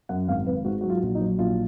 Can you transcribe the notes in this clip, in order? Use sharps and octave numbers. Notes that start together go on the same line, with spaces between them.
F#2 F#5
G#1 F5
G#1 B4
G#2 F#4
F#3 F#4
F4
A#1
D#4
F#3
A#1 F4